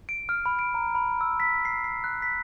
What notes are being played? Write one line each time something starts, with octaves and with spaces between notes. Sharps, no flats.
D7
F6
B5
D7
A#5
B5
E6
B6
C7
C7
F#6
B6